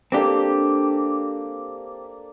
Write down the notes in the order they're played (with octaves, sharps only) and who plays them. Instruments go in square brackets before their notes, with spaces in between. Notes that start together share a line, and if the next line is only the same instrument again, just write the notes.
[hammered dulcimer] A#3 D4 A4 [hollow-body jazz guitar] C4 G4